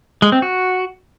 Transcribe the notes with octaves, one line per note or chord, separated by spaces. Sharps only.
G#3
C4
F#4